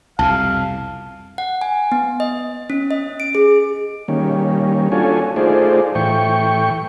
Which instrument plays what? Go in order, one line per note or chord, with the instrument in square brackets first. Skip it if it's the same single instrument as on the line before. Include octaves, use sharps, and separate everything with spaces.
[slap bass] C2 F2 B2 [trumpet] F5 [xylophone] A5
[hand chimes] F#5
G#5
B3
D#5
C#4
D#5
D7
G#4
[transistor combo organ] D#3 G3 A#3 C#4
D4 F4 F#4 A4 C#5 G#5
A3 D#4 F4 G#4 C5 D5
A2 E3 G5 C#6